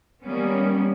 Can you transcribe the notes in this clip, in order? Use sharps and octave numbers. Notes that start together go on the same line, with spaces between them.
D#3 G3 A#3 B3 C#4